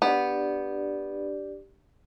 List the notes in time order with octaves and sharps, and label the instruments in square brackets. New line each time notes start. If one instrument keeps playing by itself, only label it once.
[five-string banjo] B3 [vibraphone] D4 G4 D5